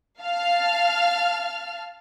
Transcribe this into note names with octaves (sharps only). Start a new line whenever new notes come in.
F5 A5 F6